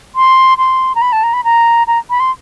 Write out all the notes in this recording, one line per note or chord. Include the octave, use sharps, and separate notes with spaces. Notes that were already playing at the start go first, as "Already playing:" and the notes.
C6
C6
A#5
B5
A5
A#5
B5
A#5
A#5
B5
C6